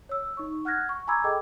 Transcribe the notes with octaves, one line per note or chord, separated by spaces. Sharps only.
C#5 E6
D#4 C#6
F#5 F6 F#6 G#6 A#6
C#6
G#5 A#5 B5 D6 E6 G#6
G#4 A4 D#5 G5 D6